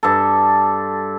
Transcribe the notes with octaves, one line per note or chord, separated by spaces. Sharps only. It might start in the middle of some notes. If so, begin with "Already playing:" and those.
G2 A4